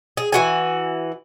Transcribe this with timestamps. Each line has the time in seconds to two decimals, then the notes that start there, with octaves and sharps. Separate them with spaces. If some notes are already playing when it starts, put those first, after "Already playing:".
0.17 G#4
0.33 E3 F#4 G#5